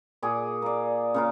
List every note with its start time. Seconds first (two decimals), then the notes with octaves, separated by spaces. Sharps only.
0.22 A#2 G#4 D6
0.62 A#3 D5
1.14 C#3 A#3 F4